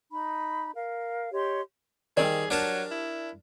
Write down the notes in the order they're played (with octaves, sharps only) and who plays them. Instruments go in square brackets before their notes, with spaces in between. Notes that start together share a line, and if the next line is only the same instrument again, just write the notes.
[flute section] D#4 B5
A#4 F5
G4 C#5 D#5 C6
[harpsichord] D#3 [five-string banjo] G3 C4 D5 [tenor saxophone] G#4
[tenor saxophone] F#3 [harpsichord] D4 A#4 A5
[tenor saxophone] E4